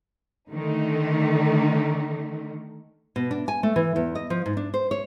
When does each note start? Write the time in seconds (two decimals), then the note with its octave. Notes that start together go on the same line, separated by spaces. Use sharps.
0.52 D3 D#3 A3 D#4
3.16 B2
3.31 D4
3.48 G#5
3.63 A3
3.76 E3
3.96 E2
4.15 D#5
4.30 F3
4.46 G#2
4.57 D4
4.74 C5
4.91 C#5